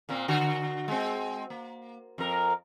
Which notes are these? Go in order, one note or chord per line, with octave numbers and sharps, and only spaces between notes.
A#2 A#3 C4
D3 F#4
G#3 C4
A#3
F2 A#4